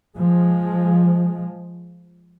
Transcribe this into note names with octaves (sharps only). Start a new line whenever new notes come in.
F3 G#3